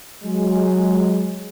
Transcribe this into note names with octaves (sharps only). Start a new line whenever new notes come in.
F#3 G#3